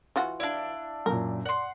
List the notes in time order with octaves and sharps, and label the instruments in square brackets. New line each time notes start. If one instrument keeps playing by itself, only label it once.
[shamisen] E3 F4 F#4
[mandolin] D4 E4 [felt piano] D5 F5
[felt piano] F#2 A#2 [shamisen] A#4
[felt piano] D5 [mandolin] F#5 C6